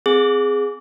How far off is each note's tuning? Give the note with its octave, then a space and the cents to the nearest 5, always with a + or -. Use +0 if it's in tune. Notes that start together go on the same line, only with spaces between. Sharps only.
C4 -20 G#4 +0